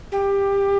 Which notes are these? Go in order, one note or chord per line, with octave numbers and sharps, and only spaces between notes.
G4